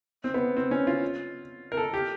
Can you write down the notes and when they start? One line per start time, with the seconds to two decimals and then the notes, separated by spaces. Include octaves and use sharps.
0.24 C4
0.34 B3
0.56 C4
0.71 C#4
0.87 F4
1.72 A#4
1.77 A4
1.94 G4